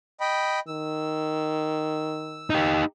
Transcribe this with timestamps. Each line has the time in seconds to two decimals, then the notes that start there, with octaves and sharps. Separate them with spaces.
0.20 D#5 G5 B5
0.68 D#3 E6
2.50 D#4 G4